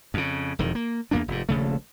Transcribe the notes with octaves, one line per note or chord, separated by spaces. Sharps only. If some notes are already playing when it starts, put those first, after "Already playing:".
F2 C#3
E1 F2 D#3
A#3
E2 A#3 B3 D4
F1 G#2
D#1 A#1 C#3 A3